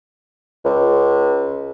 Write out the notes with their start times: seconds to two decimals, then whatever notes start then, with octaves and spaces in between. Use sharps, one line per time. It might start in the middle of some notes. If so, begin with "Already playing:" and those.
0.65 C#2